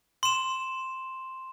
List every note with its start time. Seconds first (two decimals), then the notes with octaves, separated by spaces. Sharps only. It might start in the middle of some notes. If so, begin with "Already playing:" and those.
0.23 C6 E7